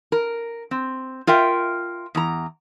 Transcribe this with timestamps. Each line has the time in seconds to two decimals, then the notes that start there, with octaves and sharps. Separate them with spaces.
0.12 A#4
0.71 C4
1.27 F4 A#4 E5 G5
2.15 E2 A#5